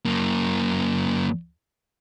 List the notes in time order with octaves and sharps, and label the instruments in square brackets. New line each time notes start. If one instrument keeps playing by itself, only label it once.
[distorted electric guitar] F#2 A#3